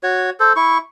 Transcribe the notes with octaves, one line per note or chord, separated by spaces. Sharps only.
F#4 C#5
A4 C5
E4 C#6